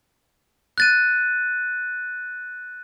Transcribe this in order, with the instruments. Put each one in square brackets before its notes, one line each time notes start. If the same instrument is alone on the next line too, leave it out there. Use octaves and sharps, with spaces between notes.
[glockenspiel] F#6 A6 D#7